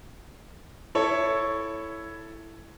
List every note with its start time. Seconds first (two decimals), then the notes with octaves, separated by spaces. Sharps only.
0.95 E4 A4 C#5